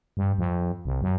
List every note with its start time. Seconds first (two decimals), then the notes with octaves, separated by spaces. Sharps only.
0.17 G2
0.38 F2
0.85 C2
1.02 F#2